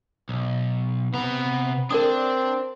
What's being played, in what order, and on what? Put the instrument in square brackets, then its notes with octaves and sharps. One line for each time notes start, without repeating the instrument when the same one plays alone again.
[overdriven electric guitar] B1
[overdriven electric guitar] C3 A#5 [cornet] B3
[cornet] C4 [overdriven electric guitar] D4 [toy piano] A#4 D5 D#6